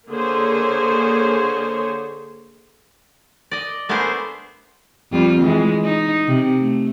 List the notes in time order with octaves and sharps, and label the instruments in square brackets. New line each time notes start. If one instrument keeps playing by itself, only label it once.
[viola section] D3 A#3 G#4 C5 C#5
[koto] D5 D#5
A3 B3 D4 G#4 A#4 C5
[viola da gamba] F2 G3 F4
E3 G#3
D#4
C3
A3